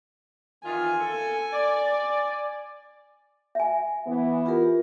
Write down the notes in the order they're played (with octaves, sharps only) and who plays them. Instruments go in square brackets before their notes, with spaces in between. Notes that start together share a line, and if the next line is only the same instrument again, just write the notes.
[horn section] D#3 E3 F4 [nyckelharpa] G#5
[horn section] A4
D5
[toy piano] E5 G#5
[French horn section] E3 B3
[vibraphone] F4 G4 A#4